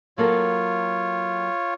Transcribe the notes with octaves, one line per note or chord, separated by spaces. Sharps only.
F#3 A#3 F4 A4 C#5